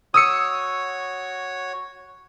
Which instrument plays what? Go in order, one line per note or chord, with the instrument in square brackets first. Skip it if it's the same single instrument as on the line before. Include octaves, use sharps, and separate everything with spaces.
[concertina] F#4 C#5 [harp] D#6 E6 C#7